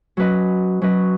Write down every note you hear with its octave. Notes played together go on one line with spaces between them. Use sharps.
F#3 C#4 B4 D#5
F#3 C#4 B4 D#5